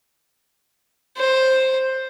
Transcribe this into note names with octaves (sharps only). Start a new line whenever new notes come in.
C5